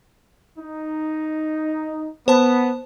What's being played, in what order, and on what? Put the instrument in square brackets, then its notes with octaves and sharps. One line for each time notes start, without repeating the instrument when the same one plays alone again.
[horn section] D#4
[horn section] B3 [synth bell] C5 A5